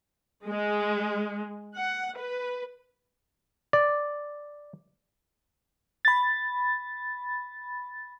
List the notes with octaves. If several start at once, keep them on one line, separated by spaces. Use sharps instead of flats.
G#3
F#5
B4
D5
B5 A6